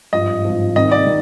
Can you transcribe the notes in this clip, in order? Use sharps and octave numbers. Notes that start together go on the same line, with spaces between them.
G#1 G2 F3 D#5
G#1 G2 F3
C2 C3 D#3 D#5
D5
D#3